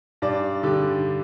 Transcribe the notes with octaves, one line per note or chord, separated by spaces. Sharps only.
G2 D5
D3 G3